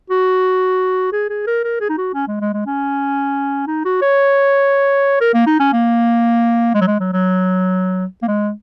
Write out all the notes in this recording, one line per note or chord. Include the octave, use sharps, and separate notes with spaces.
F#4
G#4
G#4
A#4
A#4
G#4
D#4
F#4
C#4
G#3
G#3
G#3
C#4
D#4
F#4
C#5
A#4
A#3
D#4
C#4
A#3
G#3
F#3
G#3
F#3
F#3
A#3
G#3